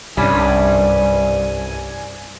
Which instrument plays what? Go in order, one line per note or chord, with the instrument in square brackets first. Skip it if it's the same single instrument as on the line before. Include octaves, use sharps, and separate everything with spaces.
[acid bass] C2 [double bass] G2 [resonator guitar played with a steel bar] G3 C#4 D4 [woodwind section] G#5